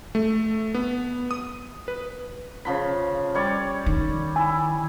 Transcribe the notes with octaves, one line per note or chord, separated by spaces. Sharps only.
A3
B3
D#6
B4
C#3 F3 B5
G3 C#5 D5
D#3
E4 G#5